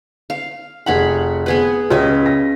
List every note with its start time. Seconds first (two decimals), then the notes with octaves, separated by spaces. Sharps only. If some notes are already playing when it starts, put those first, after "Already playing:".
0.30 F5
0.86 F1 G#4 F#5 A#5 B5
1.46 B3 G#4 B4
1.90 C#2 C#3 D#5 E5
2.26 A#6